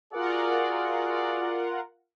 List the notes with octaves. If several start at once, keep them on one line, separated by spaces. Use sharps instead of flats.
F4 F#4 G#4 A#4 D5 F#5